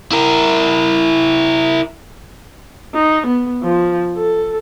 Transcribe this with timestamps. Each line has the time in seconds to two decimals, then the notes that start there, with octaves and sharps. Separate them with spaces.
0.12 E4 A#4
2.94 D#4
3.27 B3
3.62 F3
4.17 A4